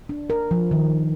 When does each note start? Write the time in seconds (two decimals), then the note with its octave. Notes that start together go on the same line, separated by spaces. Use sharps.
0.09 D4
0.30 A#4
0.51 F3
0.71 D#3